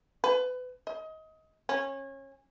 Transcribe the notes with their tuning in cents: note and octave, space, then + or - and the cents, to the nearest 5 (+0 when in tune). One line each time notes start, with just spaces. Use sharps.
B4 +30
D#5 +25
C#4 -25